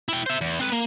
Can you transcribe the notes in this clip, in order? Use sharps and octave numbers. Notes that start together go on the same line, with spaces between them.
E4 G5
C5 E5
E2
C4 B4
A#3